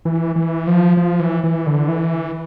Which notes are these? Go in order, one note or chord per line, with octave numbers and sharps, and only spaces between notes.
E3
E3
F3
F3
E3
E3
D3
E3